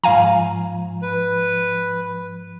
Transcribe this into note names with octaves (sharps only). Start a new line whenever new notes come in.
G#2 F3 F5 G#5 A#5
B4